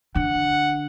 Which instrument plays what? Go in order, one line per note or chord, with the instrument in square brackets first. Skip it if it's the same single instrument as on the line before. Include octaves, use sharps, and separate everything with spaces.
[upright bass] D3 [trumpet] F#5